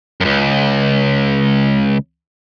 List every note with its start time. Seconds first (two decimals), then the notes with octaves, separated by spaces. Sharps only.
0.20 C#2 F#2